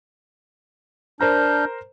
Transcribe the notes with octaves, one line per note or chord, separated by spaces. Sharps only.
D4 A#4 C5 A#5 F6 G6